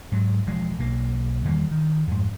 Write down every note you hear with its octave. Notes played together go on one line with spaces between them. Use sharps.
G#2 F#3
E1 F3 G#3
B1 A#3
E2 D#3 G3 A#3
D#3
F2 G#2